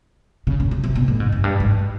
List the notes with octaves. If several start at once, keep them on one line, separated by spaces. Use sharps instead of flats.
C#3
C#3
C#3
C3
B2
A2
G#2
F#2
G2
G#2